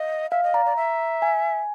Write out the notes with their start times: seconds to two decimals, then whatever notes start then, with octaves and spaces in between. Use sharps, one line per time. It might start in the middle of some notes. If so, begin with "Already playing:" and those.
Already playing: D#5 F5
0.31 E5 F5
0.43 D#5
0.54 D5 A#5
0.66 D5
0.76 E5
1.22 G#5